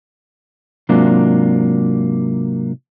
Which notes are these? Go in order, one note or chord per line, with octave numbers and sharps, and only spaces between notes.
G#2 C3 F#3 A#3 D4 F4